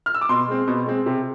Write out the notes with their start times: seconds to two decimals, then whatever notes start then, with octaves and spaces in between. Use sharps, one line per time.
0.06 F6
0.15 E6
0.21 D6
0.29 B2 C6
0.48 G#3 C4
0.68 B2
0.86 G#3 C4
1.06 C3